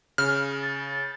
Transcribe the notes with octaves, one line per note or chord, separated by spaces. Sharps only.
C#3 F6
A6